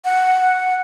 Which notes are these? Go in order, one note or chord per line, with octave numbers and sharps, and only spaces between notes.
F#5